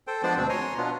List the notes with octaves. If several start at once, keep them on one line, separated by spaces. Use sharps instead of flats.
A4 C5 G5
F3 G#3 B3 D4 C5 D5
D2 B2 C4 D4
C#5 G#5 A#5 C6
B2 B3 D4 F4